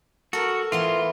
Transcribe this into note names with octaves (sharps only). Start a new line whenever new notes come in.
F#4 A4 A#4
E3 B3 F4 C6